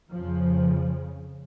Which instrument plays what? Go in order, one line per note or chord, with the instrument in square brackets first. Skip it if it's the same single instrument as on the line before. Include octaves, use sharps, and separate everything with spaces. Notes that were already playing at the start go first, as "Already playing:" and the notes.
[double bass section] F2 C#3 F3